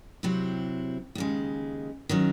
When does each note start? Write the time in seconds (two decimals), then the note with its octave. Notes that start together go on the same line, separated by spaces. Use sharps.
0.23 C3 F#3 C4 E4
1.15 D#2 C#3 G#3
2.09 D#3 F#3 C#4